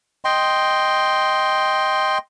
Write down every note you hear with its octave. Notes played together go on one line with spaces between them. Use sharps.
D#5 G5 C6